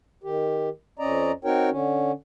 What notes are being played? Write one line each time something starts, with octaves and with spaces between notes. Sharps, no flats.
D#3 G4
F2 C#4 D5 D#5 A#5
C4 D#4 F#4 A#4 C#5 G5
D3 C#4